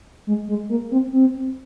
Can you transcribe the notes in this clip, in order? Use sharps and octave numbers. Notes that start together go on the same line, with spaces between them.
G#3
G#3
A#3
C4
C4